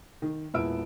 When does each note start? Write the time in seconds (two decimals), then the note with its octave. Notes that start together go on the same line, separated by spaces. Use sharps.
0.22 D#3
0.54 E1 A#2 B3 E4 E6 D7